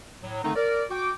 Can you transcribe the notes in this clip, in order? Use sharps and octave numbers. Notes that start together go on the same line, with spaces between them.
A2 F#3
D3 D#3 A3 C4 D#4
A#4 D5
F#4 G5 D6